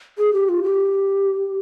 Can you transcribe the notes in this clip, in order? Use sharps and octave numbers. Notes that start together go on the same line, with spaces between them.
G#4
G4
F4
G4